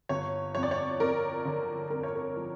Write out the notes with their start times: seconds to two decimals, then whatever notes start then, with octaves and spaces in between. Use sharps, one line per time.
0.09 G1 C#5
0.55 F2 C#5
0.63 D5
0.71 C#5
1.00 F2 A#4
1.45 D3
1.90 F2 A#4
2.03 C#5
2.15 A#4
2.37 F3